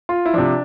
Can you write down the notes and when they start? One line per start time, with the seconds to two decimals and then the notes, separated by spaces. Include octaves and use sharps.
0.09 F4
0.26 E4
0.34 C3 F3 D4